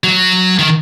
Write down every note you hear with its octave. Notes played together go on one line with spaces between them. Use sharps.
F#3
D#3